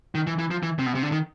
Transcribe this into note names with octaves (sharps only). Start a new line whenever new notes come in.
D#3
E3
E3
F3
E3
C3
B2
C3
D3
D#3